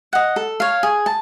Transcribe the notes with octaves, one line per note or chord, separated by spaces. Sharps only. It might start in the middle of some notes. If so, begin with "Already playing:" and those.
D#5 F#5
A4
C#5 F5
G#4
A5